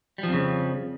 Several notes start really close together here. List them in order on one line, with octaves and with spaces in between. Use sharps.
G3 F3 F2 C#3